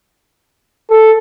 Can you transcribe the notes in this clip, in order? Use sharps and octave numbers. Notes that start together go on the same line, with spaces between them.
A4